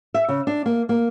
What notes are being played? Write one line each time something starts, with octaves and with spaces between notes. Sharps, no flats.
E5
C#3
D4
A#3
A#3